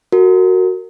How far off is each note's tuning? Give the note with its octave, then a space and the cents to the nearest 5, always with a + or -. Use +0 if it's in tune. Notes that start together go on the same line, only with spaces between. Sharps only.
F#4 +0 A#4 -25